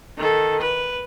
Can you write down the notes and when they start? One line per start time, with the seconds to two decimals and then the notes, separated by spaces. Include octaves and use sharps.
0.18 D#3 A4
0.61 B4